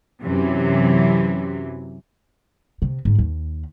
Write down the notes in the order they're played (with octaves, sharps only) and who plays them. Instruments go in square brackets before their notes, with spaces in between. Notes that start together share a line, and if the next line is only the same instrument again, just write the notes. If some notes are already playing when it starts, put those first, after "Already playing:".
[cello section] F#2 C3 E3 F#3
[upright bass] C3
G#2
D#2